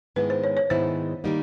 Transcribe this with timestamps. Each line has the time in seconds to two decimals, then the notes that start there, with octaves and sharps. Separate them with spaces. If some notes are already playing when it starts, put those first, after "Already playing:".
0.16 G#2 D#3 G#3 B3 E4 B4
0.30 C5
0.44 C#5
0.57 C#5
0.70 G#2 D#3 G#3 B3 E4 C5
1.24 D#3 G3 A#3 D#4